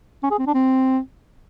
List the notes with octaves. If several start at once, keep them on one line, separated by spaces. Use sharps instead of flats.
C#4
G#4
C4
D4
C4